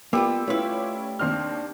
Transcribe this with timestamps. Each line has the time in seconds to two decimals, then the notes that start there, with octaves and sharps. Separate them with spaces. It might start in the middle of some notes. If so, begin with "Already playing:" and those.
0.13 G3 A#3 B3 F4 D6 E6
0.48 A3 C#4 E4 F4 B4
1.19 D#2 C4 D4 F6